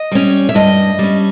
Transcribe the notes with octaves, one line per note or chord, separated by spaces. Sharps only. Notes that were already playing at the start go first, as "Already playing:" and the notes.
Already playing: D#5
G3 C#4
E5
G2 D#5
G3 C#4